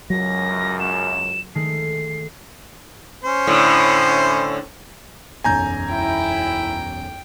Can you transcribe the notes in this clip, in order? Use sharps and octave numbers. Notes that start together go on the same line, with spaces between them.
C#2 F#2 F#3 A#6
E7
D#3 G#3 A3 C7
C#4 C5
A2 D3
E1 B1 F#2 G#5 A#5 G6
E4 G5